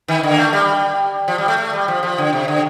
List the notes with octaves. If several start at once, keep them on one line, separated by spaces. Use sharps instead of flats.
D#3
D3
A#3
A3
G3
F3
G3
A3
A3
G3
F3
F3
D3
C3
D3